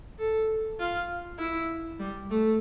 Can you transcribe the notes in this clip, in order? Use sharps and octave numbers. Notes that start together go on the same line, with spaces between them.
A4
F4
E4
G3
A3